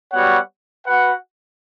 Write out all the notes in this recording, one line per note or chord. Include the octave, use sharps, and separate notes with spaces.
G3 B3 F#4 C#5 F#5
F#4 B4 F#5